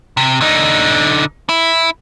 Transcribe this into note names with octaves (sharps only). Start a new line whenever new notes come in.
C3
D3 D#4
E4